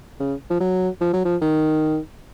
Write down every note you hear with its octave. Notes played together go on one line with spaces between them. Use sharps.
C#3
F3
F#3
F3
F#3
F3
D#3